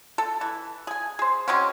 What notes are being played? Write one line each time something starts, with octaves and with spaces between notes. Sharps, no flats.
A4
E3
G#4 G#5
G#4 C5
F#3 G#3 C4 C#4